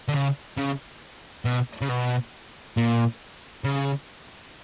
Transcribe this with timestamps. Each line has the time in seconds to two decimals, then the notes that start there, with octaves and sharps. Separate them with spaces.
0.09 D3
0.14 C#3
0.57 C#3
1.45 B2
1.82 C#3
1.89 B2
2.77 A#2
3.64 C#3